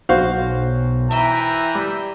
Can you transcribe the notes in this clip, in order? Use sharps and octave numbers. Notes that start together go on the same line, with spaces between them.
B1 F#4 C5 F5
E3 E5 G5 A#5 D#7
G3